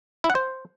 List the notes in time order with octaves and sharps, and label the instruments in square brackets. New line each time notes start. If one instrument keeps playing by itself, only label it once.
[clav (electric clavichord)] E4
F#5
C5